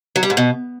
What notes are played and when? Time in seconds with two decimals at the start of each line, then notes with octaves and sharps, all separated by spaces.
0.16 F#3
0.23 G3
0.30 G#2
0.37 B2